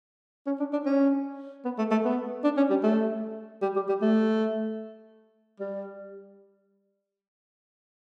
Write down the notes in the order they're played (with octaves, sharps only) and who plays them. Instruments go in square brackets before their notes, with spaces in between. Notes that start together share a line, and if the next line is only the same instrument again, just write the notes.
[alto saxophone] C#4
D4
D4
C#4
B3
A3
A3
B3
D4
C#4
G3
A3
G3
G3
G3
A3
G3